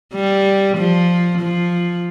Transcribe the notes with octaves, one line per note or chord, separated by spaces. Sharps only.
G3
F3
F3